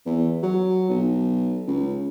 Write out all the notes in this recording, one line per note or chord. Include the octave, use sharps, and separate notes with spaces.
E2
F#3
B1
C#2